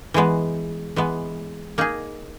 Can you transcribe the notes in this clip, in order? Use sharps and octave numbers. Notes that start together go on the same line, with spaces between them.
E3 G#3 B3
E3 G#3 B3
A#3 D#4 G#4